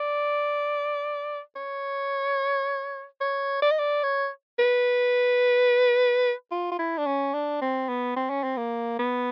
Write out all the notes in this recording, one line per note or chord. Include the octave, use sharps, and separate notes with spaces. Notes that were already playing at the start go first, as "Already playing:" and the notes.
Already playing: D5
C#5
C#5
D5
D#5
D5
C#5
B4
F4
F4
E4
D4
C#4
D4
C4
B3
C4
C#4
C4
A#3
B3